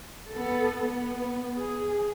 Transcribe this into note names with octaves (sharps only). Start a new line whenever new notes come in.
B3 A4
B3
G#4